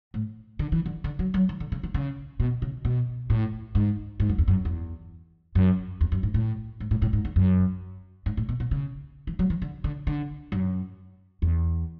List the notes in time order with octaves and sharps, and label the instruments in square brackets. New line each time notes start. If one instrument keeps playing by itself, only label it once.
[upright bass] A2
D3
E3
D3
D3
F#3
F#3
E3
D3
C#3
E3
C#3
B2
C#3
B2
A2
G#2
G#2
F#2
E2
F#2
E2
F#2
E2
F#2
G#2
A2
G#2
A2
A2
G#2
E2
F#2
G#2
A2
B2
B2
C#3
E3
F#3
E3
D3
D3
D3
F#2
E2